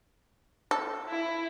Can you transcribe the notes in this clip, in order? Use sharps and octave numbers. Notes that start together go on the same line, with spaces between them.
A4
E4